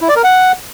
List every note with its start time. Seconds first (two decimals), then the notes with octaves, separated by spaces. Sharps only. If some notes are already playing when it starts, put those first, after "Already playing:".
0.01 E4
0.08 D5
0.16 A#4
0.24 F#5